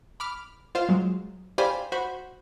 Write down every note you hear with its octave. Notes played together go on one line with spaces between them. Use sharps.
B5 D6 F6
F4 C5 F5
F#3 G#3
G4 C5 D5 F5 G#5 B5
F#4 C5 B5 C#6